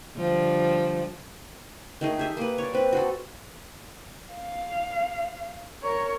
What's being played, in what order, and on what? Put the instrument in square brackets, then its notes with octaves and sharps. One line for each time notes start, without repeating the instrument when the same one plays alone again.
[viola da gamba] D3 F3 G3
[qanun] D#3 A3 G#4
G4 G#4 E5
A#3 B4
C#5 D5
C4 B4
F#4 G#4 A4
[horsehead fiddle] F5
A#4 C#5